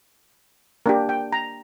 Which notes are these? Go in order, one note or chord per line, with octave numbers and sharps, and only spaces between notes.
A#3 D4 G4 A#4
G5
A#5